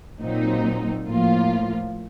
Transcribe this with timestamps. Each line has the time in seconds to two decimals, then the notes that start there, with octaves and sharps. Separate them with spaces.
0.20 A#2 F#3 C4 D#4
1.06 A2 F3 A#3 F4